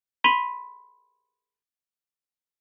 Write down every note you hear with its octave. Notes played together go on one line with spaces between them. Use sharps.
B5 C6 B6 D#7 F7